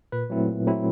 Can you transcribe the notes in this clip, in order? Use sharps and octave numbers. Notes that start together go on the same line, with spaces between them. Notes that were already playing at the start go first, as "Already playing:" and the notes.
A#2 B4
F#3 A3 C4 E4
A#2
F#3 A3 C4 E4